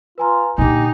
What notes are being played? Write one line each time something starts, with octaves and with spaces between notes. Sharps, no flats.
F4 B4 G#5 A#5
A#2 D3 D#4 G4 G#5